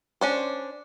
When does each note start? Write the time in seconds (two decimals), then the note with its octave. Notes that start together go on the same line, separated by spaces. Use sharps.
0.21 C#4 D4 C5